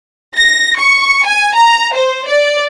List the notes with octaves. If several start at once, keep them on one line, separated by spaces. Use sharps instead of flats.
A#6
C#6
G#5
A#5
C5
D5